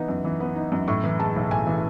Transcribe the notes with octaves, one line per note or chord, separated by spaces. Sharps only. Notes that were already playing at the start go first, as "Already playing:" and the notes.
Already playing: E3 B3 D#4
F#2
E3
B3
D#4
F#2
A2 C#6
E3
G#3 A5
B1
A2 G#5
E3